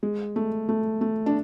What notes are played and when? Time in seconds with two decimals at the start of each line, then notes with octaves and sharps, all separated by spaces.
0.03 G#3
0.36 A3
0.69 A3
1.01 A3
1.26 D4